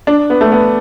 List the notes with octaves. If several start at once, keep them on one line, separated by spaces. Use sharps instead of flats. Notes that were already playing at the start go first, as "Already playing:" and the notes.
D4
B3
A3
B3